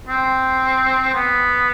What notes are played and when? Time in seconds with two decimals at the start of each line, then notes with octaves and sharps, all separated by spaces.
0.09 C4
1.14 B3